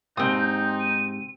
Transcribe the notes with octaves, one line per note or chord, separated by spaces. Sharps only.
G#2 C3 C4 D#4 G5 D#6
G6
D#7